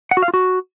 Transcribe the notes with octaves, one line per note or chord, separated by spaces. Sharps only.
F#5
F#4
F5
F4
F#4